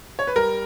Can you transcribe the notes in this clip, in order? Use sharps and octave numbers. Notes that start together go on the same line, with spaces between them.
C#5
B4
G3 A#4